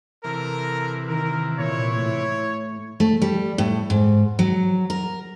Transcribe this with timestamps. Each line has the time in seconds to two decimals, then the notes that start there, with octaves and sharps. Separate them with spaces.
0.24 C3 E3 A4 A#4
1.08 D#3 A#4
1.59 A#2 E4 C#5
1.95 A2
3.00 A3
3.22 G3
3.58 A2
3.90 G#2
4.39 F#3
4.90 A#4